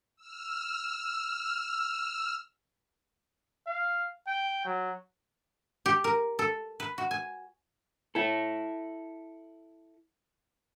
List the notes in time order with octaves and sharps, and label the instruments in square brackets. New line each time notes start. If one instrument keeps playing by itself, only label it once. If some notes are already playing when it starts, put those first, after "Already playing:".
[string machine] E6 F6
[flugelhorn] F5
G5
F#3
[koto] G4
A#4
A4
B4
F#4
G#5
[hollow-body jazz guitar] E4 A4